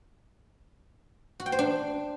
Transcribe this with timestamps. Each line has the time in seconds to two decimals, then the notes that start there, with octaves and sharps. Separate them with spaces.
1.40 F#4
1.46 G5
1.52 C5
1.59 D4